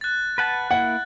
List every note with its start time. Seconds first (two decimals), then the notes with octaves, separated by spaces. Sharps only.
0.01 F#6 A6
0.38 B4 F#5 A5
0.71 A#3 E4 F#5